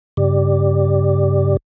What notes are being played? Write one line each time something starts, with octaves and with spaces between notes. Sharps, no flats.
G2 C#3 G4 D5